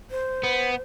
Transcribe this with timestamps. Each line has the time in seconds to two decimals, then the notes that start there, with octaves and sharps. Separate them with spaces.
0.11 C5
0.43 B3